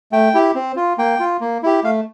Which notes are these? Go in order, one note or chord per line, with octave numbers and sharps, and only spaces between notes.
A3 G5
E4 G4
C4
F4
A#3 G5
F4
A#3
E4 G4
A3 F5